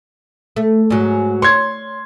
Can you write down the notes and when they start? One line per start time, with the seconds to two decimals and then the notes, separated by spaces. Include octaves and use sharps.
0.56 A3
0.90 G#2 F#3
1.42 C#5 C6 G#6